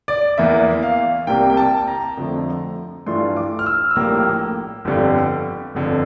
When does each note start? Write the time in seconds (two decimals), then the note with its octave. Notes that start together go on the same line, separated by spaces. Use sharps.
0.08 D5
0.38 E2 E3 A#3 E4 E5
0.83 F5
1.27 C2 C3 G3 A#3 G5
1.50 G5
1.57 A5
1.87 A#5
2.17 F2 D3 F3 A3
3.07 G2 E3 A3 D4 F4 C6
3.37 D6
3.59 F6
3.66 E6
3.91 E6
3.96 A#1 A2 G3 A#3 F6
4.85 G1 F2 D3 G3
5.75 G1 F2 D3